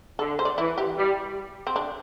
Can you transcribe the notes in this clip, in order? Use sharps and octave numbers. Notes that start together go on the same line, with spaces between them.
D3 A4
C5
D5
E3 E4
G4
G3
C4
D4